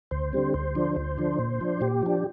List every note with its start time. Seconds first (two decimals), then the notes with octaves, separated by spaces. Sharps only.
0.11 D2 C5
0.33 D3 G3 C4
0.54 D2 C5
0.75 D3 F3 D4
0.96 D2
1.18 D3 F3 D4
1.39 A#2
1.61 F3 D4
1.81 A#2 G4
2.03 F3 D4